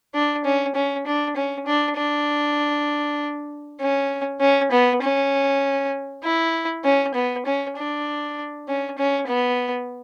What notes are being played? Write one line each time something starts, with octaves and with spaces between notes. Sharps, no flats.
D4
C#4
C#4
D4
C#4
D4
D4
C#4
C#4
B3
C#4
E4
C#4
B3
C#4
D4
C#4
C#4
B3